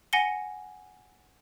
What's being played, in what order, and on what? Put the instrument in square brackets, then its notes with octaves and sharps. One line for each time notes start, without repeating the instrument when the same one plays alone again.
[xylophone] F#5 G#5 A#6 C#7 G7